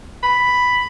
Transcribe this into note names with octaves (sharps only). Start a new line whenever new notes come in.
B5